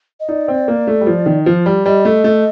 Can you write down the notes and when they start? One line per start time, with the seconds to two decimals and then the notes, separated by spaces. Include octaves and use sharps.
0.20 D#5
0.28 D#4 D5
0.48 C4
0.68 A#3
0.87 A3
1.01 G3
1.07 F3
1.26 D#3
1.46 F3
1.66 G3
1.85 G3 D#5
2.05 A3
2.24 A3